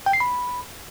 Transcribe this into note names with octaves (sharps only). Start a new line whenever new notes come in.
G5
C7
B5